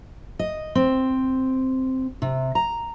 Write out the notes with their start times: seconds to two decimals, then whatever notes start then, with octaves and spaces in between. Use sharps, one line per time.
0.39 D#5
0.75 C4
2.22 C3
2.55 A#5